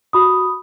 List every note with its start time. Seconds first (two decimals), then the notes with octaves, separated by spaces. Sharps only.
0.13 F#4 B5 D#6